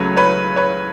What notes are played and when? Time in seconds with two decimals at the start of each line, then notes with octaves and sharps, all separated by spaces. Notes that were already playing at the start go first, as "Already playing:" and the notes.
Already playing: C#2 C#3 F#3 A3 B4 C#5
0.17 B4 C#5
0.56 B4 C#5